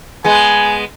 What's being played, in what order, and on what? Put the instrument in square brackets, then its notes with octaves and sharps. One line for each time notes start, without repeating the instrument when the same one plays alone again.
[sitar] G#3 B3 [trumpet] G#5